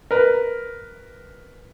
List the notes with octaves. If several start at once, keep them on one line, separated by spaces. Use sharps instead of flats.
A#4 B4